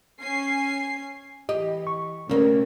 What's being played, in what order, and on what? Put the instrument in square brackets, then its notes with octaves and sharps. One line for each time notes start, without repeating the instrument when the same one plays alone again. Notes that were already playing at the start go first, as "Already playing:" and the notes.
[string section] C#4 G#5 C7
[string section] E3 [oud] G4 [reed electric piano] D#5
[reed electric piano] C#6
[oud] D2 A#3 [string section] C3 A3 [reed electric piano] C#4